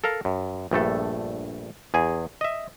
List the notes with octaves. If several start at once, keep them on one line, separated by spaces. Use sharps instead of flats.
A4 A#4 F5 A#5
F#2
A#1 G2 A3 A4
E2 G#4 G#5
D#5 E5